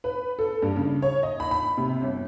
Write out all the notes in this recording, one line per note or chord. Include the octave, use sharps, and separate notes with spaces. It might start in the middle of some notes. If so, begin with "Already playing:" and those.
B4
A4
G2
C#3
C#5
D#5
B5
B5
C3
G1